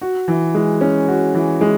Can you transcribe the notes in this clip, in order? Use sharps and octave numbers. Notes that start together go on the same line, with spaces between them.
F#4
E3
G#3
C#4
F#4
E3
G#3